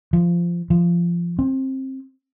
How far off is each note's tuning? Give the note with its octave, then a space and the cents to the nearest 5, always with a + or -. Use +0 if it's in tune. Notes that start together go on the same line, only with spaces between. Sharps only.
F3 -15
F3 -20
C4 +20